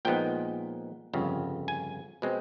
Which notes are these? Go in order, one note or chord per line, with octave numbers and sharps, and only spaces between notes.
A#2 F3 G#3 B3 D#4 G5
G1 F2 C#3
G#5
B2 G#3 C4